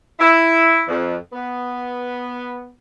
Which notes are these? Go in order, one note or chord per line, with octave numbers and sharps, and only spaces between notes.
E4
F2
B3